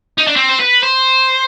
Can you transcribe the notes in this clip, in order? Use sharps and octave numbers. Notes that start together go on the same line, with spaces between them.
D#4
D4
C4
C5
B4
C5